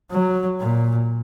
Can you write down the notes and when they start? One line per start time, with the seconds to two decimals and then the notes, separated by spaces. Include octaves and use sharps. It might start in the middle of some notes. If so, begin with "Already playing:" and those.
0.11 F#3
0.60 A#2